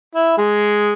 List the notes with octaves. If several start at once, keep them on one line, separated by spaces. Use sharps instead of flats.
E4
G#3